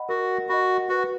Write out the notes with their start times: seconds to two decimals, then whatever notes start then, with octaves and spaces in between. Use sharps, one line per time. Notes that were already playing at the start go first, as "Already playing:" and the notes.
Already playing: D#5 F#5 B5
0.09 F#4 A#4
0.49 F#4 D#5 F#5 B5
0.89 F#4 B4